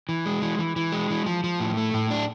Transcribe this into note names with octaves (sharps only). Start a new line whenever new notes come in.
E3
G#3
E3
E3
E3
G#3
E3
F3
F3
A2
A3
A2
D4